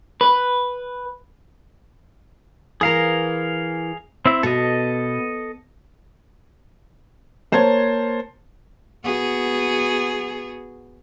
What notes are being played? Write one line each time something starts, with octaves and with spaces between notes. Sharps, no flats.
B4
E3 G#4 A#4 F5 A#5
C4 E4 E5
B2 A4 D#5
A#3 C5 C#5 A5 G#6
B3 F#4 G#4